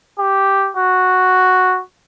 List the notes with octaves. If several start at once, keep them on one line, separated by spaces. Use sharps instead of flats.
G4
F#4